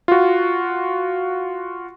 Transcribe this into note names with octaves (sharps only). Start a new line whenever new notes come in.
F4 F#4